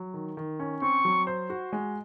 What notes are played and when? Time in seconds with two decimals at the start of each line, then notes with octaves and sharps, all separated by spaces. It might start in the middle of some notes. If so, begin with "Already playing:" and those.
Already playing: F#3
0.14 D#3
0.37 D#3
0.60 C#4
0.82 C4 C#6
1.05 F#3
1.27 C5
1.50 F#4
1.73 G#3